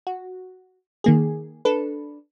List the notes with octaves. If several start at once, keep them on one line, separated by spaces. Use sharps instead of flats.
F#4
D#3 A#3 G#4
D4 A4 B4